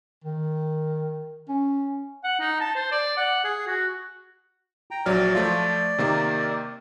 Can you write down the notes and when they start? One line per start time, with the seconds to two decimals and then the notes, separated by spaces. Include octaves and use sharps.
0.24 D#3
1.49 C#4
2.23 F#5
2.39 D#4
2.60 A5
2.75 C5
2.91 D5
3.17 F#5
3.44 G#4
3.67 F#4
4.91 G5 A#5
5.06 A#1 F#3 D5 F6
5.35 F3 A3 F4
5.98 C3 D#3 A#3